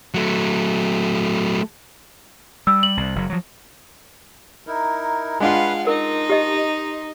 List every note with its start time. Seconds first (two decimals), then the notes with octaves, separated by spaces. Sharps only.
0.14 F#3 A3
2.67 G3 E6
2.83 F#7
2.97 C2
3.16 F#1 F#3
3.30 F3 F#3
4.67 D#4 E4 A#4
5.40 G#3 D4 F4 B4 F5 F#5 B5 C6
5.87 D#4 A#4 C6
6.30 G4 D#5